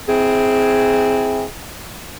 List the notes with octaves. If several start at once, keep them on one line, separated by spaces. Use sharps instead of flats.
C4 E4 G#4